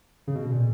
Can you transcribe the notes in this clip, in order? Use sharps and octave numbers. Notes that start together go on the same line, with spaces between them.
C#3
B2
A#2